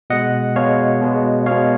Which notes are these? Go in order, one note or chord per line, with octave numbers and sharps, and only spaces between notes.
B2 G#3 D#5 F#5
B2 G#3 C#5 F5
B2 G#3
B2 G#3 C#5 F5